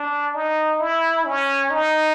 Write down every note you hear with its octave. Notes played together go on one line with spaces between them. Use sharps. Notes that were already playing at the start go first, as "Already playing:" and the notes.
Already playing: D4
D#4
E4
C#4
D#4